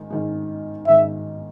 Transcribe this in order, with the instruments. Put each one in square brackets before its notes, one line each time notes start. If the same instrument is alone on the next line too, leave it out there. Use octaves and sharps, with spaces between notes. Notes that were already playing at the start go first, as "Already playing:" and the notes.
Already playing: [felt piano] G#2 D#3 G#3
G#2 D#3 G#3
[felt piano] G#2 D#3 G#3 [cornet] E5